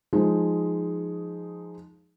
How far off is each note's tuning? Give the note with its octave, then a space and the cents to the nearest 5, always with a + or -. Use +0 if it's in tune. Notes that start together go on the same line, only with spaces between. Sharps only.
F3 +0 G#3 +0 D#4 +0